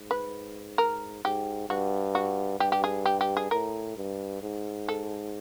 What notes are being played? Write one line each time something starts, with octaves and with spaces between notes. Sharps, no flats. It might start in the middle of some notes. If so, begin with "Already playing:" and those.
Already playing: G#2
B4
A#4
G#2 G4
G2 F#4
F#4
G2 G4
G4
G#4
G4
G4
G#4
A2 A#4
G2
G#2
A4